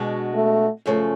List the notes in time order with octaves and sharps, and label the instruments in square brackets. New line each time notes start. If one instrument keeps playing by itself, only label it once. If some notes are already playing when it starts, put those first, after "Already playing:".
Already playing: [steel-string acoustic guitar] B2 G#3 D4 F#4
[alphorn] A3
[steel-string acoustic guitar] F#2 C#3 F3 A3